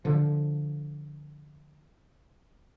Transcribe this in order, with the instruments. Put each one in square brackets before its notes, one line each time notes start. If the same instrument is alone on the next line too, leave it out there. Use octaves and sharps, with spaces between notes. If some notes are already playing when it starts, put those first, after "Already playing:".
[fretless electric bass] D3 F3